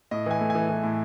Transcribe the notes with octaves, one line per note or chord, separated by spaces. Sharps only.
A2 D#5
E3 G#5
A3
G#5
E3
E3
A2